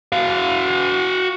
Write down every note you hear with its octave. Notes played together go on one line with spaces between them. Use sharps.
F#4 F5